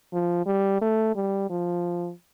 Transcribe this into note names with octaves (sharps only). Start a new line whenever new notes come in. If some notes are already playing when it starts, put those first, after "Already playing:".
F3
G3
A3
G3
F3